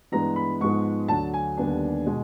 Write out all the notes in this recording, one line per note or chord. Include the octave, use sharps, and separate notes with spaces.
G2 E3 G#3 B3 A#5
B5
G#2 F3 G#3 B3 C#6
D2 D3 F#3 A5
G#5
D#2 D3 G3 B3 D4
B2 G#3